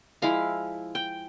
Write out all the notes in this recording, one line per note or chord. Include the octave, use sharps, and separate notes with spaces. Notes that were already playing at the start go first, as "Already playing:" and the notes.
F3 G#3 E4 F5
G5